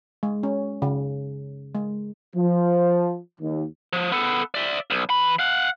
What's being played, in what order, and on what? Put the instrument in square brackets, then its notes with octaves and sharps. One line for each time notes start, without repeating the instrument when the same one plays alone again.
[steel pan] G#3
C#4
C#3
G#3
[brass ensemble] F3
D#2
[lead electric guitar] F3
B3 A4
D5 E5
B1
E3 B5
F5 F#5